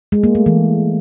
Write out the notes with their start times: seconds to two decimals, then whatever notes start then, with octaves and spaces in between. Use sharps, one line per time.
0.12 G#3
0.24 A#3
0.35 A3
0.46 E3